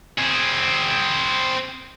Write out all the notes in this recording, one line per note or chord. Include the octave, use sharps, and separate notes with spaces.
C4 G#4